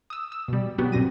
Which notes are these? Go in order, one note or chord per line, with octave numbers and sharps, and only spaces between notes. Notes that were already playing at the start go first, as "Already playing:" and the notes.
D#6 E6
E6
B2 G3
F#3 B3 F#4 G4
A#2 C4 A#6 D#7